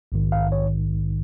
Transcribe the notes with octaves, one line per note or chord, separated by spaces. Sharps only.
A#1 G#2 D#3
F5
C#5